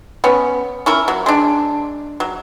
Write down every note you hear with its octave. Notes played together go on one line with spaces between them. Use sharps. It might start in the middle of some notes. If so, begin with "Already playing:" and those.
B3 C#4
C#4 E4 A#4
F#3
G#3 D4
F#3